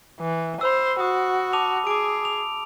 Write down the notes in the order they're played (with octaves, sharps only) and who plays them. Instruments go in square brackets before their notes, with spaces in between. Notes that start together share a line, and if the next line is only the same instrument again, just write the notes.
[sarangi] E3
[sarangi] C5 [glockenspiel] B5 E6
[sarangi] F#4 [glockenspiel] D#6
[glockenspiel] A5 D6 F7
[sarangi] G#4 [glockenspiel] D6 D7
[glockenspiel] F7